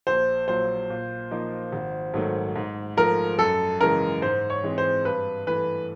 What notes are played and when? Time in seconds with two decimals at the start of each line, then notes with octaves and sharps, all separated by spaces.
0.07 A#1 C5
0.48 A#2 F#3 C5
0.90 A#2
1.31 F3 A#3 D#4
1.72 G#1
2.14 G#2 D#3 F#3 A3
2.56 G#2
2.97 F3 A3 A#4
3.39 F#2 A4
3.80 C#3 E3 G#3 A#4
4.22 G#2 C5
4.50 C#5
4.63 E3 G#3 C4
4.78 C5
5.05 G2 B4
5.47 E3 A3 B4